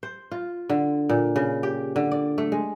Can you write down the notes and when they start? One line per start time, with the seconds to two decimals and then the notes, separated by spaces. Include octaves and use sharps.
0.03 C5
0.32 F4
0.70 D3
1.09 A#2
1.36 C#3
1.63 G4
1.96 D3
2.12 D5
2.38 A3
2.52 G#3